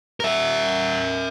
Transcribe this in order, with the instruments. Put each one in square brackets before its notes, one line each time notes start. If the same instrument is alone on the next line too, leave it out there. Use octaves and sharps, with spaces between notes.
[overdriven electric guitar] A#4 E5